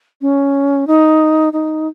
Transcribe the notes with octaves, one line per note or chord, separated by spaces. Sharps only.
C#4
D#4
D#4